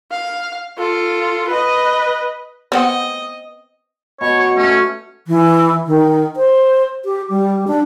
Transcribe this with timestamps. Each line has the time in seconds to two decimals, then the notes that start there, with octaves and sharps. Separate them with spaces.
0.12 F5
0.78 F4 A4
1.48 B4 D#5
2.72 B3 C4 D#5 F#5
4.21 B2 C#5
4.40 C#5
4.56 A3 C#4
5.27 E3
5.87 D#3
6.36 C5
7.05 G4
7.30 G3
7.67 D4